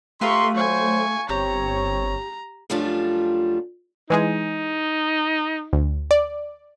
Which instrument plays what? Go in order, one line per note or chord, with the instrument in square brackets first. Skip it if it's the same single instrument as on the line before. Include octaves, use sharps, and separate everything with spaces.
[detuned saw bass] A3 [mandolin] F4 B4 [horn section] G4 A#5 C6 [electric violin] E5 C#6
[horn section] F#3 C5 [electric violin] G#5 C#6
[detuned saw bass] G1 [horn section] C4 C#5 [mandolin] G4 [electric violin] A#5
[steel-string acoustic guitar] F#2 F3 G3 A3 D4 F4
[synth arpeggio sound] E3 G#3 G#4 [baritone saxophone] D#4
[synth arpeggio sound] D2
D5